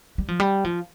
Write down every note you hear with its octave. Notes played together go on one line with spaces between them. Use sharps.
G3
F3
G3
F3